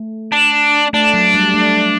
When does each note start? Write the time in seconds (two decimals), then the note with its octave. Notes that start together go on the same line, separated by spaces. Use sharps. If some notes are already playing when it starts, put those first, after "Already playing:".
Already playing: A3
0.33 D4
0.93 A3 D4
1.14 F#3
1.34 G3
1.54 A3